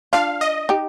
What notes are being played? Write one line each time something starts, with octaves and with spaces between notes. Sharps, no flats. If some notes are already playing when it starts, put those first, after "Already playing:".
D4 F4 F5
D#5
D#4 G4